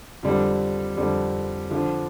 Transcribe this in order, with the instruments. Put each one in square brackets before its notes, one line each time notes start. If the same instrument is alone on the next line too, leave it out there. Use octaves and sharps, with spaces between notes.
[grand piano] F2 D3 G3
F2 D3 G3
D3 F3 D4